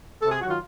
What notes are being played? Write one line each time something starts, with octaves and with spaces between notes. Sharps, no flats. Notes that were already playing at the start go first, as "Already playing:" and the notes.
C3 A4
G#4
D#3 F#3 F#4
F4